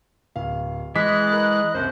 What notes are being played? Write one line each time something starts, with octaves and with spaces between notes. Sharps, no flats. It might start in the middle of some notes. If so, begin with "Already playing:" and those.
D1 F5
E3 G#3 D#5 F#6 B6
A#4 B5 A6
F#1 C2 C5